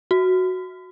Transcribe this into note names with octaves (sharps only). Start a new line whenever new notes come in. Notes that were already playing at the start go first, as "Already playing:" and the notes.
F#4